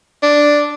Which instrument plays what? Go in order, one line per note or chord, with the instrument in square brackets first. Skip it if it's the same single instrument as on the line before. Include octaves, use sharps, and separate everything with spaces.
[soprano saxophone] D4